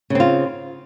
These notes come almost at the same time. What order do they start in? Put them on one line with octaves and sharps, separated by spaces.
C#3 C4 F4